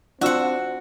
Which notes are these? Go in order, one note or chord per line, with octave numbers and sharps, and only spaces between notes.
C4 D4 F4 F#4 F#5 E6